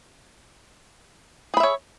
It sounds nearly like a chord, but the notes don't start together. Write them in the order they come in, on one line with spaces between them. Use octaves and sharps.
G#4 B5 E5 C#5